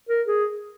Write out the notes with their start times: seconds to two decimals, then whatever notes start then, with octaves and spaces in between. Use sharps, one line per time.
0.09 A#4
0.27 G#4